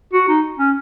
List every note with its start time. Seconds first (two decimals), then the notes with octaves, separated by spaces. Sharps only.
0.13 F#4
0.28 D#4
0.59 C#4